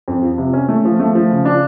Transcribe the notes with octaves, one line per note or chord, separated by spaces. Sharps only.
F2
F3
C3
C#4
A3
F3
A3
F3
C#3
D4